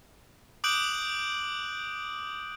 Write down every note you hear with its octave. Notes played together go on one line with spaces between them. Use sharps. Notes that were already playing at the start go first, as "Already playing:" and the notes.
D6 D#6 F#6 G6 D7 F#7